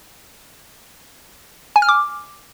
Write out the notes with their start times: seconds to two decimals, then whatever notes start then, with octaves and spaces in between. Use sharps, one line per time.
1.76 G#5
1.82 F6
1.89 D6